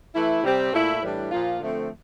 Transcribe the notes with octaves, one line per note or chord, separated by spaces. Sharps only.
E3 A3 E4
C3 G3 C4 G4
A#2 A3 E4
A2 E3 G3 D4
A#2 F3 A#3 F4
D3 F3 A3 C4